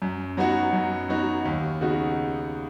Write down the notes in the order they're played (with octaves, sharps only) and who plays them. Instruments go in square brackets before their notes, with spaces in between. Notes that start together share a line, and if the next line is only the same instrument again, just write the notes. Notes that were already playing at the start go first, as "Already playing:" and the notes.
[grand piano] F#2
F#3 B3 D#4 F#4
F#2
F#3 B3 D#4 F#4
D#2
C#3 B3 D#4 F#4